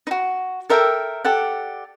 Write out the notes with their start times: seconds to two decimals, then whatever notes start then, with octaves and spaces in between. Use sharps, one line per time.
0.07 D#4 F#4
0.70 A4 A#4 E5 G5
1.25 G4 A4 D5 F#5